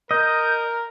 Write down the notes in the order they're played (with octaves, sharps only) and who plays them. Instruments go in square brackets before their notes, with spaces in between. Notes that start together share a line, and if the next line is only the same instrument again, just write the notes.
[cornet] A#4 [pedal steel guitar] D#5 [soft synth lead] G6